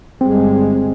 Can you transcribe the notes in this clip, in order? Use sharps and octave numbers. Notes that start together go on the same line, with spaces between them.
G1 G3 G#3 C4